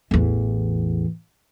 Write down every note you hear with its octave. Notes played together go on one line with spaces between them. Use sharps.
A1 E2